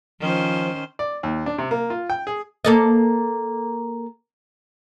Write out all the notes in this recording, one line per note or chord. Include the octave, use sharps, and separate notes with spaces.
D#3 F3 C#4 C5
D5
D#2
D4
C3
A#3
F4
G5
G#4
A#3 A4 D#5